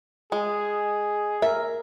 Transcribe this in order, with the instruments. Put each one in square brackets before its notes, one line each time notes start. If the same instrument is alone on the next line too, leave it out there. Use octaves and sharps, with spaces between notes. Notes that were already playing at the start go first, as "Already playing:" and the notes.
[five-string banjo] G#3 [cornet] G#4
[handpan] A#4 [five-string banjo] E5